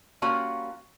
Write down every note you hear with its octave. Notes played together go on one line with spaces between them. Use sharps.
G3 A#3 C#4 F4 F#4